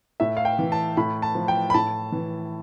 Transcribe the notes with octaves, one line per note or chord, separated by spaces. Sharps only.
A2 E5
F5
G5
E3
A5
A2 B5
A5
F3
G5
B5
A2 A5
E3